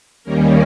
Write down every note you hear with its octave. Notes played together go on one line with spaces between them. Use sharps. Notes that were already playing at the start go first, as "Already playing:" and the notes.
D#2 D#3 G3 A#3 C#4 A#4